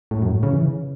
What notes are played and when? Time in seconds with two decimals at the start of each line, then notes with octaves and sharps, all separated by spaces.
0.11 A2
0.22 F#2
0.32 A2
0.43 C#3
0.52 E3
0.62 C#3